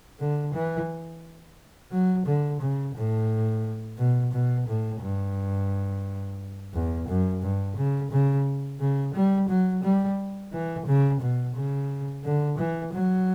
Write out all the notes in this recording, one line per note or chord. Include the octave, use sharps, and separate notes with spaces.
D3
E3
F#3
D3
C#3
A2
B2
B2
A2
G2
E2
F#2
G2
C#3
C#3
C#3
G3
F#3
G3
E3
C#3
B2
C#3
D3
E3
F#3